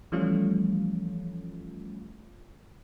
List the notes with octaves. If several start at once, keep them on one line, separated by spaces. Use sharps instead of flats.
E3 F3 G3 A3 C#4 F4